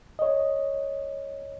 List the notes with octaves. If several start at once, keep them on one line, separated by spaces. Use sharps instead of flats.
C#5 D#5